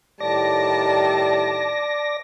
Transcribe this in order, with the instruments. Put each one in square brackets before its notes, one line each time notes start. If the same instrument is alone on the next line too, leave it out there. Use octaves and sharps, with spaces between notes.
[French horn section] A2 D#3 G3 [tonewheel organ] D5 A#6 [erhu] A5